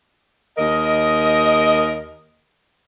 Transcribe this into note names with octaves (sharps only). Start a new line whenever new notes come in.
D#2 A#4 D#5